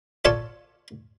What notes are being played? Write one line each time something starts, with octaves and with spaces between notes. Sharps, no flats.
F4 A4 C#5 D5 A5